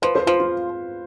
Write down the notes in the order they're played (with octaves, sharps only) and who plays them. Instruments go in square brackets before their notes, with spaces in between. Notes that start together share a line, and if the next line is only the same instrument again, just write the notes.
[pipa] F3 [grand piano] B4
[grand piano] C5
[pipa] F3 [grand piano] F4
[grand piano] F4